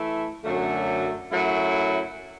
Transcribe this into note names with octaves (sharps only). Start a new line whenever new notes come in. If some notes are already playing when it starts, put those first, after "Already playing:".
Already playing: E3 A3 E4
F#2 D3 F#3 A3
F#2 F#3 A3 E4